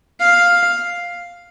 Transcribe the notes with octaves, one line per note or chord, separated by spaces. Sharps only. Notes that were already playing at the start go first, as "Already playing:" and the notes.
F5